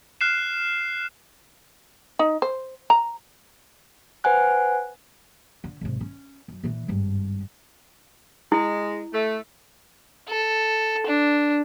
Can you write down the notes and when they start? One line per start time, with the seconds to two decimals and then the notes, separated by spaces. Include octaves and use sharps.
0.21 F6 F#6 C7 E7
2.19 D#4
2.42 C5
2.90 A#5
4.24 B4 C5 F#5 G#5 F#6
5.64 D3
5.81 G#1 C3
6.00 C#4
6.48 F#2
6.63 A#2 E3
6.88 G#1 G2
8.52 G#3 E4
9.13 A3
10.29 A4
11.06 D4